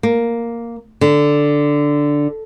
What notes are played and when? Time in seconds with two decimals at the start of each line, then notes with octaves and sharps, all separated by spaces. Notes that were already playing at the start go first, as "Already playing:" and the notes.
0.03 A#3
1.01 D3